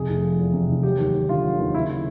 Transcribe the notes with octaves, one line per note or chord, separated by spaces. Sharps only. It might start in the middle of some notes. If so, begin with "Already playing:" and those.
Already playing: F2 C3 G#4
F1
F3
E2
C3
F1
F#3 G4
D#2
D#2
D3 F4
F#3
D#2
C#3 E4